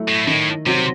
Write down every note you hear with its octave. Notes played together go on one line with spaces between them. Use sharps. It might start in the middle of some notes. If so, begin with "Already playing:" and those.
Already playing: F#3 A3 E4
A2
A2 D#3
C3 F#3 C4 F#4